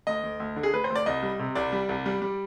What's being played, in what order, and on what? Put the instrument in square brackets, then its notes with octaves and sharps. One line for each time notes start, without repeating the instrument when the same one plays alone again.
[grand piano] D2 D#5
D2
D2
D3
G#4
D2 B4
C5
D2
D5
C2 D#5
G3
C3
C2 D5
G3
C2
G3
G3